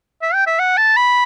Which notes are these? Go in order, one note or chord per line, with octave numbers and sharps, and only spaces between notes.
E5
G5
E5
F#5
A5
B5